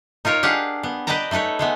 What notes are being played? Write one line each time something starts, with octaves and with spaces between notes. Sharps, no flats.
D#4 F4 A#4 C#5
D4 G4 G#4 F5 F#5
B3
B4 D5 D#5 G5 A5 A#5
A3 D#4 A4 B4 C#5
G#3 A3 B3